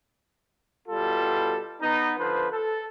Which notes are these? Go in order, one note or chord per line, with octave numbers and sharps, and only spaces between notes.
B2 G3 F4 A4
B3 D#4
D3 F3 B4 C5
A4